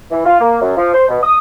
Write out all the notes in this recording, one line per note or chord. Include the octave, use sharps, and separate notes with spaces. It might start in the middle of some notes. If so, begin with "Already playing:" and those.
E3
F4
A#3
F#2
F3
C5
B2
D#6